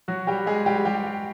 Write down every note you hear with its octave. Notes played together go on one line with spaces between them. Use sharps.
F#3 F#4
G3 G4
G#3 G#4
G3 G4
G3 G4